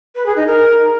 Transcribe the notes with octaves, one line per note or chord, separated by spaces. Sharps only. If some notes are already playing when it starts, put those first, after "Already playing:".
B4
G#4
D#4
A#4